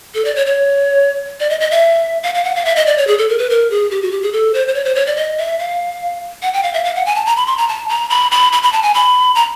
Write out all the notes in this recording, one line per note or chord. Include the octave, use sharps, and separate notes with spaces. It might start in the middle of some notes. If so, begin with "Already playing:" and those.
A4
D5
C#5
C#5
D5
D#5
D#5
E5
F5
F5
F#5
F5
E5
D#5
D5
C#5
G#4
A4
A#4
B4
A#4
G#4
G4
F#4
G4
G#4
A4
C5
C5
C#5
C5
C#5
D5
D#5
E5
F5
F#5
G5
F5
E5
F5
F#5
G#5
A5
A#5
B5
C6
A#5
A5
A#5
B5
B5
B5
B5
A5
G#5
B5
A#5